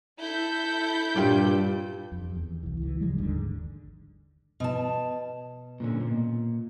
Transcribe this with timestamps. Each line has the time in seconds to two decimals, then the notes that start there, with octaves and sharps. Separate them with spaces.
0.20 E4 A4 G6
1.16 G2 A#2 G3 D5
2.12 F2
2.36 E2
2.63 B1 E3
2.82 C#2 E3
3.00 C#3 F3 G3 G#3
3.18 G#1 D#2 G#2 D3
4.60 B2 A5
5.80 A#2 D3 C#4
6.01 A#2